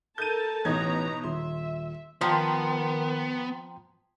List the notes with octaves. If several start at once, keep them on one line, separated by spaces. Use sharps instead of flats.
A4 A#4 A5 G6 D#7
A1 B2 D#4 B4 C#5 A#5 G#6
D#1 E5 C6
D#3 F3 B3 G5 A#5 C6